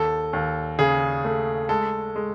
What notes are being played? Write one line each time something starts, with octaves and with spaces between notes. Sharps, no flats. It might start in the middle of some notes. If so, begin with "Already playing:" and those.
Already playing: D#2 A4
D#2
C#3 G#4
A3
G#3 A4
G#3